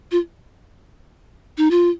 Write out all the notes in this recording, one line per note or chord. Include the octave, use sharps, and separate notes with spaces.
F4
D#4
F4